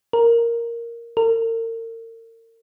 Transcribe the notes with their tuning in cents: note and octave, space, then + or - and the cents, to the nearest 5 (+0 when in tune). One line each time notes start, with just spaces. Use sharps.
A#4 +0
A#4 -40